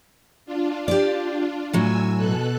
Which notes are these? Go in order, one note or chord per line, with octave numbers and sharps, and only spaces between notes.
D4 F4
G4 D5
A2 F#3 G#5 E6
B2 A4 F#6